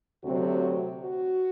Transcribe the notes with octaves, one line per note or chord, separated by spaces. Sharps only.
D2 C3 F#3 C4 F#4
F#4